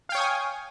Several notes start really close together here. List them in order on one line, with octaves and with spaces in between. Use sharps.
F5 G5 C#5 D#6 G#5